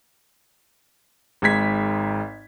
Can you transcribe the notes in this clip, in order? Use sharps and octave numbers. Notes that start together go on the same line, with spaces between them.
G#1 G#2 G#6 B6